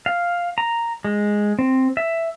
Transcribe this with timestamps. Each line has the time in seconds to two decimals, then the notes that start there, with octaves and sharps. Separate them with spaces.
0.06 F5
0.58 A#5
1.04 G#3
1.59 C4
1.97 E5